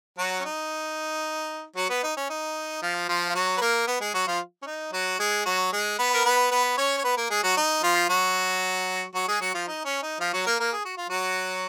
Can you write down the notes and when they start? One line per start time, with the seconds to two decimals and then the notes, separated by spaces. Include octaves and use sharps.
0.18 F#3 F#4
0.40 C#4
0.45 D#4
1.76 F#3 F#4
1.90 B3 B4
2.03 D#4
2.17 C#4
2.30 D#4
2.82 F3 F4
3.09 F3 F4
3.29 F4
3.35 F#3 F#4
3.57 B4
3.61 A#3 A#4
3.87 B3 B4
4.01 G#3 G#4
4.14 F#3 F#4
4.27 F3 F4
4.62 C#4
4.66 D#4
4.93 F#3 F#4
5.19 G#3 G#4
5.45 F#3 F#4
5.72 G#3 G#4
5.98 B3 B4
6.14 A#4
6.25 B3 B4
6.51 B3 B4
6.78 C#4 C#5
6.98 C#5
7.04 B3 B4
7.17 A#3 A#4
7.30 G#3 G#4
7.43 F#3 F#4
7.57 D#4
7.83 F3 F4
8.09 F#3 F#4
9.15 F#3 F#4
9.28 G#3 G#4
9.41 F#3 F#4
9.54 F3 F4
9.68 D#4
9.85 C#4
10.03 D#4
10.20 F3 F4
10.33 F#3 F#4
10.46 A#3 A#4
10.60 A#3 A#4
10.73 G#4
10.85 F#4
10.97 F4
11.09 F#3 F#4